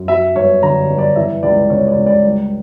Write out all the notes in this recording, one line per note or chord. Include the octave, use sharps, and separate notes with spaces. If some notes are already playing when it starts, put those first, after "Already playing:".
Already playing: F#2
F#3 E5
G2 C#5
D3 A#5
G2
D5
E3 E5
C#2 D5
C#3 C#5
D5
C#2
D5
G3